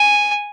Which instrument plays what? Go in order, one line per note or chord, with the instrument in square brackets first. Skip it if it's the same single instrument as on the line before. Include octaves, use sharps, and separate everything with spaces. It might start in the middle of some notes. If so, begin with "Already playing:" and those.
Already playing: [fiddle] G#5